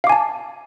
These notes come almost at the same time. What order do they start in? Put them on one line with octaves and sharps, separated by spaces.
F5 D6 G#5 A5